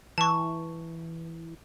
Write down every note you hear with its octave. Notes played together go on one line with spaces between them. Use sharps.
E3 A5 C#6